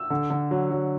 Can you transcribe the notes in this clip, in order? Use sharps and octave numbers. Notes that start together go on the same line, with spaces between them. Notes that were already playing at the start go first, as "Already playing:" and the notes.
Already playing: E6
D3
D3
F#3
F#3